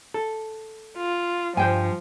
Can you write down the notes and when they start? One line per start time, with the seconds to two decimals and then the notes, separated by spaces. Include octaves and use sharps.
0.14 A4
0.97 F4
1.57 G2 F3 C5 G5 G#5